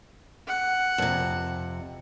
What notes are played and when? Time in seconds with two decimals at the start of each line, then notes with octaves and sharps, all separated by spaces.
0.48 F#5
0.98 F2 C3